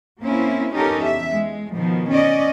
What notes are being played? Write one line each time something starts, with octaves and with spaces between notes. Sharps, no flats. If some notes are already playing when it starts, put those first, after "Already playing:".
A#3 C4 C#4 E4
B3 C#4 D#4 G4 A4 A#4
E2 E5
G#3
B2 D#3 F3
C#4 D5 D#5